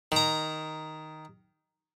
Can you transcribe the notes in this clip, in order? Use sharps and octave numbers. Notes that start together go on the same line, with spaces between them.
D#3 A#5